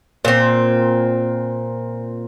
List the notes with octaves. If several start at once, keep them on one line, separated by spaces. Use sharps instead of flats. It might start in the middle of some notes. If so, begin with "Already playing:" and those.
A#2 C4